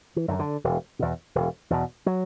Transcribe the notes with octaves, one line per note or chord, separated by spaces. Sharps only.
E3
F#2 D3
D3
E1
E2 B2
E1
E2 B2
F#3